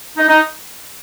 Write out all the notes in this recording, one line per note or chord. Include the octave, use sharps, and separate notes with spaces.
D#4
D#4